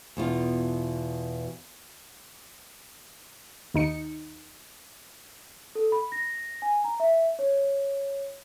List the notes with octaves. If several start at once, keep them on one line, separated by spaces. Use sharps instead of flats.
E2 B2 F4
D#2 D#4 C#7
A4
B5
A#6
G#5
A#5
E5
C#5